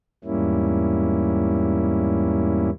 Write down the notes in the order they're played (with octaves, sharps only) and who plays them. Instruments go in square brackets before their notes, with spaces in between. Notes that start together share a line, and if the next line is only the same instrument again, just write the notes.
[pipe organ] E2 G#2 G3 A#3 C#4 E4